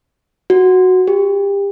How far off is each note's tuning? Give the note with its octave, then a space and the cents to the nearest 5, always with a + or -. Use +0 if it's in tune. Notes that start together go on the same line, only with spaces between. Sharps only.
F#4 -5
G4 +30